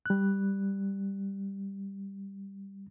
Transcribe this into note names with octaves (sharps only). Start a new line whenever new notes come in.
G3 F#6